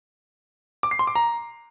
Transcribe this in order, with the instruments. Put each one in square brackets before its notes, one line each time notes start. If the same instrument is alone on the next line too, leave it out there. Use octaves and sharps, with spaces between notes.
[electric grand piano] D6
C7
C6
D6
A#5